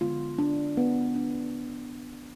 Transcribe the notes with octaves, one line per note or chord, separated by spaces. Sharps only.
D3 G#3 B3 F4
D4
B3
D4